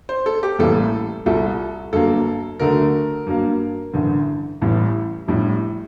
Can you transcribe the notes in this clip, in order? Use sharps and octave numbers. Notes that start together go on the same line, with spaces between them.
C5
A4
G4
A1 A2 G3 A#3 A4
C2 A#2 G3 A4
G1 G2 F#3 A#3 A4
D2 D3 F#3 A3 A#4
G2 F#3 A#3
A1 G2 D3
A1 A2 G3
A#1 A2 G3